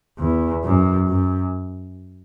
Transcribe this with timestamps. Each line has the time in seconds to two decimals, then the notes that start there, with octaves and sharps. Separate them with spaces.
0.19 E2
0.65 F#2
1.09 F#2